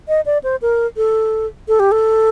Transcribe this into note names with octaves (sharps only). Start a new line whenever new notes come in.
D#5
D5
C5
A#4
A4
A4
G4
A4